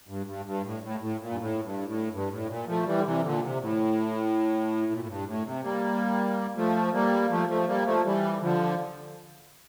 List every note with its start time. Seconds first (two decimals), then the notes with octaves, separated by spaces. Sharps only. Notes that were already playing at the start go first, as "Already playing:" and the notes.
0.08 G2
0.26 G2
0.45 G2
0.64 A2
0.83 A2
1.00 A2
1.19 A#2
1.31 G2
1.39 A2
1.63 G2
1.87 A2
2.12 G2
2.30 A2
2.49 A#2
2.67 F3 A3
2.86 E3 G3
2.98 D3
3.05 C3 E3
3.24 A#2 D3
3.42 C3
3.60 A2
4.92 A#2
5.00 A2
5.08 G2
5.27 A2
5.45 C3
5.63 G3 A#3
6.56 F3 A3
6.93 G3 A#3
7.30 F3 A3
7.48 F3 A3
7.67 G3 A#3
7.85 F3 A3
8.05 E3 G3
8.41 D3 F3